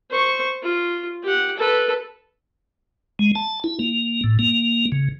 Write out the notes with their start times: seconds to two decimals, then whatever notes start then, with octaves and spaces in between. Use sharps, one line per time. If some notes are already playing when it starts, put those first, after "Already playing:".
0.10 C5 C#6
0.63 F4
1.23 G4 F#5
1.57 A4 B4
3.19 G#3
3.35 A5
3.64 E4
3.79 A#3
4.24 A2
4.39 A#3
4.92 C#3